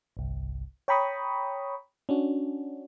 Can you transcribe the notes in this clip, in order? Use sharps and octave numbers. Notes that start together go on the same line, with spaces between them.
G1 C2
C#5 G5 A#5 B5 C#6 D#6
C#4 D4 F#4